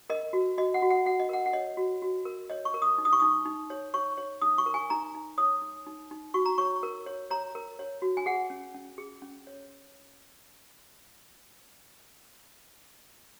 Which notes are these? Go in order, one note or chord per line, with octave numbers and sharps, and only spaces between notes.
A#4 D#5
F#4
F#4 D#5
F#5
F#4
F#5
F#4 F#5
D#5
A#4 F#5
F#5
C#5 D#5
F#4
F#4
A#4
C#5 D#5
C#6
A#4
D#6
D#4
D#6
C#6
D#4 D#6
D#4
C#5
C#5 C#6
C#5
D#4 D#6
C#6
A#4
G#5
D#4 A#5
D#4
C#5 D#6
D#4
D#4
D#4
F#4 C#6
A#5
C#5 C#6
A#4
C#5
C#5 A#5
A#4
C#5
F#4
G#5
G#4 F#5
C#4
C#4
G#4
C#4
C#5